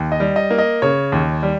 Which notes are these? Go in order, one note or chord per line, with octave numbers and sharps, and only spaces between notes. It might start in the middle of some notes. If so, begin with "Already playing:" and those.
Already playing: D#2
D#5
G3
D#5
A#3
D#5
C#3 C#5
D#2
G3